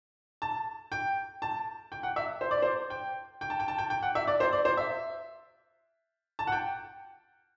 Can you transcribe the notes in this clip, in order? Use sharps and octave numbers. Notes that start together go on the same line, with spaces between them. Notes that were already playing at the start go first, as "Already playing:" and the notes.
A5
G5
A5
G5
F#5
E5
C5
D5
C5
G5
G5
A5
G5
A5
G5
G5
F#5
E5
D5
C5
D5
C5
E5
A5
F#5
G5